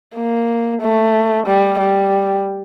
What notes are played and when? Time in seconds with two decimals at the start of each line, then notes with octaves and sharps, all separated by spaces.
0.16 A#3
0.82 A3
1.47 G3
1.79 G3